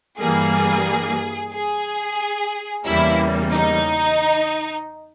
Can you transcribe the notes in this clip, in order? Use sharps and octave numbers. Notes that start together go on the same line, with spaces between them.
G2 E3 G3 A#3 G#4
G#4
E2 C#3 E3 G3 A#3 E4
D#4